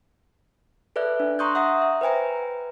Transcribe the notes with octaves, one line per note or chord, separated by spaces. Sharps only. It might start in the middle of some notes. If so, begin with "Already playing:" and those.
A4 B4 D5 E5 F#6
D4
A#5 C6 C#6 D#6 F#6 G6
E5 F#5 A#5 D#6
E5
B4 C5 G5 G#5 A#5